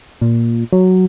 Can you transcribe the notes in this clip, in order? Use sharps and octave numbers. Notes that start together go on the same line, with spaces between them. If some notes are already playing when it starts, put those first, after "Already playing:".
A#2
F#3